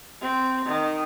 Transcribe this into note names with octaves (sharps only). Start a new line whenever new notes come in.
C4
D#3